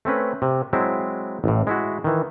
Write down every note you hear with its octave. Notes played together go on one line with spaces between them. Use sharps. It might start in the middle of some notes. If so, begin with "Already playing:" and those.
A3 C4 C#4 B4
C3
F#3 G#3 C4 E4
A1 A2
G#3 E4 F#4
D#3 E3